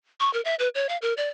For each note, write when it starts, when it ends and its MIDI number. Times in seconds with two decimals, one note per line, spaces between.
0.20 0.32 85
0.33 0.41 70
0.45 0.55 76
0.59 0.69 71
0.75 0.87 73
0.89 0.97 77
1.02 1.14 70
1.17 1.29 74